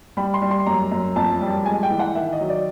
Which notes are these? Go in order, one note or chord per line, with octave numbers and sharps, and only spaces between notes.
G3 B5
C6
G3
C6
F#2 A#5
F#2
F2 A5
G3
G#3 G#5
G5
E3
F#5
D#3 E5
D#5
F#3
D5